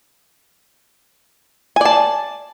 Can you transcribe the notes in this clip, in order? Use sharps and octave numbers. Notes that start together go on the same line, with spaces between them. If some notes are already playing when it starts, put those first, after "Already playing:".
D5 G#5 A5